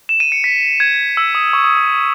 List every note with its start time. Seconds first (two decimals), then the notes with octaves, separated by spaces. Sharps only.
0.09 E7
0.20 D#7
0.32 C#7
0.44 B6
0.80 G#6
1.17 E6
1.35 D#6
1.53 C#6
1.64 D#6
1.77 D#6